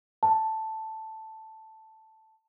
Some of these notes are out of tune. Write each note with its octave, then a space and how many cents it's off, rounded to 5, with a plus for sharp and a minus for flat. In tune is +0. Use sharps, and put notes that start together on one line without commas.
A5 +0